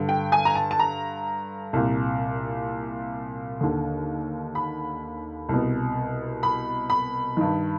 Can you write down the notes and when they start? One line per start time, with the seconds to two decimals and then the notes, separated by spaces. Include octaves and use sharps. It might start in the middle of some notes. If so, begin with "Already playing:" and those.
Already playing: G2 D3
0.09 G5
0.32 G#5
0.45 A#5
0.55 A5
0.71 A5
0.79 A#5
1.73 C2 A#2
3.61 D#2 D3
4.55 B5
5.49 C2 B2
6.43 B5
6.90 B5
7.37 G2 D#3